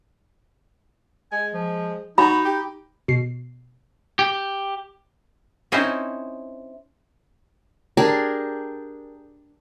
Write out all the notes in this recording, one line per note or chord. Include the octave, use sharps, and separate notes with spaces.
G#3 G#5
F3
D#4 F#4 B5
G4
B2 C7
G4
C4 C#4 D#4 E4 C5
D4 G4 G#4 A#4